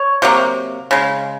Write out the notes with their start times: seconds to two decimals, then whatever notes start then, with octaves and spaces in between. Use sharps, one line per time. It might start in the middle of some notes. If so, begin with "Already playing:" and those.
Already playing: C#5
0.22 C3 F#3 A#3
0.91 C#3 G#3